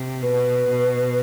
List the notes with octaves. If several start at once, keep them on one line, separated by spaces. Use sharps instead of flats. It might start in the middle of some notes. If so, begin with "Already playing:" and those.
Already playing: C3
B2 B4
B2